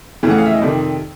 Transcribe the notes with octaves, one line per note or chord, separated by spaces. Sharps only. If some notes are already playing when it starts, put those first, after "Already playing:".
F2 C#3 E3 A3 C#4
F#5
F5
E5
D#5
F2 C3 D#3 D5